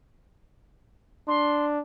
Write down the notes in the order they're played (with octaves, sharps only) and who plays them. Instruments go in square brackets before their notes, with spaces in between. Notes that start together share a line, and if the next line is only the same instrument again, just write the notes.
[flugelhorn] D4 [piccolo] C6